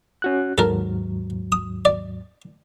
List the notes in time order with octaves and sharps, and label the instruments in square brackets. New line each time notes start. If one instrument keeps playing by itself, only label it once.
[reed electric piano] C#4 F#4 F#6
[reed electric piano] D#2 G#2 F#3 [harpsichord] A4 A#4
[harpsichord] D#6
D5